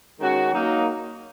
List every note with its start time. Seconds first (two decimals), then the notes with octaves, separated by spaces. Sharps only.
0.19 D#3 G#3 C#4 F#4
0.53 F#3 A#3 D#4